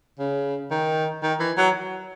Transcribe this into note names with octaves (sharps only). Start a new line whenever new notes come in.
C#3
D#3
D#3
E3
F#3